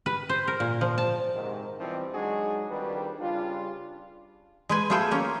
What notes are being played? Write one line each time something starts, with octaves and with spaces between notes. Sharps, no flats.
B4
C5
A#4
A#2
F3
A5
G#2 C3 D#3
B2 E3 F3 G3 C4
F#3 G#3 D4 D#4 F#4 G#4
F2 D#3 G3 D4 B4
C#3 G3 D4 F4
G#3 B4 G#5
A3 B3 F4 G#4 A4 G5
A#3 C#4